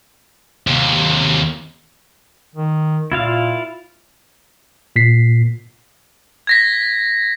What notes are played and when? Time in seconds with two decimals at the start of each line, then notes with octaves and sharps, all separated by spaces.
0.67 D#2 C3
2.55 D#3
3.12 A#2 E4 F4 F5
4.96 A#2 B6 C7
6.47 G#6 A#6 B6